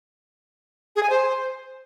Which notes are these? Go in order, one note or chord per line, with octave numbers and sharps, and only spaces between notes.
G#4
G#5
C5